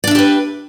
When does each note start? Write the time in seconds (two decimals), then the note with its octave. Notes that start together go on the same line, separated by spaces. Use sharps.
0.04 D5
0.07 D4
0.11 E5
0.15 G4
0.19 B4